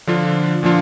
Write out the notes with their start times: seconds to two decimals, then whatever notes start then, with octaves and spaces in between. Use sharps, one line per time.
0.07 D3 F3 D4 F4
0.63 A#2 F3 D4 F4